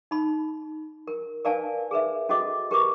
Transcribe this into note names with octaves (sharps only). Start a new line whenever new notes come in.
D#4 B5
A#4
A#4 B4 D5 F5 G#5 A5
G#4 A#4 B4 E5
C#4 F#4 A4 D#5 D6
G4 A#4 B4 C#6 D6